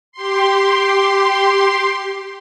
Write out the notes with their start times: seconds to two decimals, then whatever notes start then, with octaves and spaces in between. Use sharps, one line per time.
0.12 G4 C6